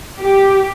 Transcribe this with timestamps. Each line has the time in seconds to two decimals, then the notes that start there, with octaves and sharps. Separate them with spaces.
0.21 G4